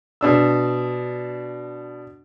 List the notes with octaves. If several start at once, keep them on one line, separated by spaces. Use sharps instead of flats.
B2 D4 E6